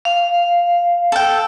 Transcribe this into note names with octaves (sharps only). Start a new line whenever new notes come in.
F5
A4 G5